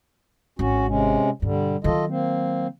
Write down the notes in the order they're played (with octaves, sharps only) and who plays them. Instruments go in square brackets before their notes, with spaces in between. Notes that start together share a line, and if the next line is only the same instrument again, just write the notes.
[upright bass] G#1 [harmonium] C#4 F#4
[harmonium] C3 G#3 C#4
[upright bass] G2 B2 [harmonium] D3 G3
[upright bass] D#3 F#3 [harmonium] F4 A4 D#5
[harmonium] A#3 C4